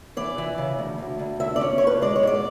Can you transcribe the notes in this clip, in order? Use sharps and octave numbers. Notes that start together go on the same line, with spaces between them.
E3 D5
E3
C#3
D2
D2
D2
D2 E5
D5
C#4
C#5
D2
B4
G#3 D5
C#5
G#2 D5